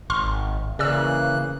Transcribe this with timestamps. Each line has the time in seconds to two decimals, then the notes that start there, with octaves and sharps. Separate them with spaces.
0.10 G#1 C6 C#6 F6
0.79 C#3 E3 A#3 G#4 D5 E6 F#6